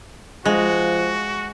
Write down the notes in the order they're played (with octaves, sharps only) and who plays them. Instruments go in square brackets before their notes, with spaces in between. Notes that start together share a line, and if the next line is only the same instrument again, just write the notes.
[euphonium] F3 [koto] G#3 [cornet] F#4